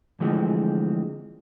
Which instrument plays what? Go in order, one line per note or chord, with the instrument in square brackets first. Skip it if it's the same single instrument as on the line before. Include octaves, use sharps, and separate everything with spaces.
[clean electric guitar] D3 E3 F3 G#3 A3 C4